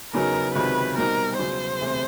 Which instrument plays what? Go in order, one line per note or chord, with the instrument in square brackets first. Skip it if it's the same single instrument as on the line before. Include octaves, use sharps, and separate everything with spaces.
[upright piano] E2 C#3 F#3 B3 D#4 [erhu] A#4
[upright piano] C#2 C3 D#3 F#3 [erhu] B4
[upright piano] B2 G3 C4 D#4 F#4 [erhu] A#4
[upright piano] E2 C#3 F#3 [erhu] C5
[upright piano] E1 D2 C3